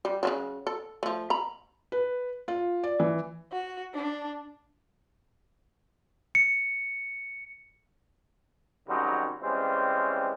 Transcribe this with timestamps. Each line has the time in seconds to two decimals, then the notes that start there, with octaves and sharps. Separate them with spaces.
0.05 G3
0.23 C#3 E3 F#3
0.67 A4
1.03 F3 A3
1.30 A#5 B5
1.92 B4
2.48 F4
2.84 D5
3.00 E3
3.52 F#4
3.94 D4
6.35 C#7
8.88 G#1 C#3 F#3 G3 D#4 C5
9.41 E3 G3 G#3 C4 C#4 F4